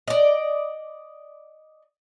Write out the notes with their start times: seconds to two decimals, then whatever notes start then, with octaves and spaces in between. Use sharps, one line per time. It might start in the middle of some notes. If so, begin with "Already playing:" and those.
0.08 D5 D#5